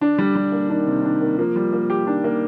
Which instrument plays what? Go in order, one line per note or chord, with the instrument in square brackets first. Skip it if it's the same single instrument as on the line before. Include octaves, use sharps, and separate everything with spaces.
[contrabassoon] D3 [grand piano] D4
[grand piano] G3
G3
A#3
[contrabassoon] D#3 [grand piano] D4
[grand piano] C3
D4
A#3
[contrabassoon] F3 [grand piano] A#3
[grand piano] G3
A#3
G4
[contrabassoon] D#3 [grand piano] D4
[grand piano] A#3